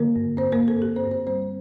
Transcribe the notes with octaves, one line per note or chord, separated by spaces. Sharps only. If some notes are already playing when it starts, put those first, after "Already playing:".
Already playing: D3 A#3 A#4
G2
G2 C4 C5
A#3 A#4
G2
A4
G2 G4
C4 C5
G2
C4 C5
G3 C4 C5